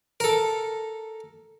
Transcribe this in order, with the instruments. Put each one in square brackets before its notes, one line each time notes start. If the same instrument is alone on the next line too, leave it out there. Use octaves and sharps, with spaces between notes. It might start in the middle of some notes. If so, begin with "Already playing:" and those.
[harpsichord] A4 A#4